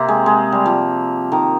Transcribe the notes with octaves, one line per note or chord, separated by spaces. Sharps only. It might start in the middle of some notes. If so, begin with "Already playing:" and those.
Already playing: C3 A#3 C4
G#3
G#3
G3
F3
D#3